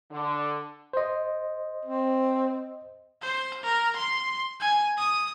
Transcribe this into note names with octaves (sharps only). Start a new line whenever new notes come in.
D3
C5 D#5
C4
C5
A#4
C6
G#5
D#6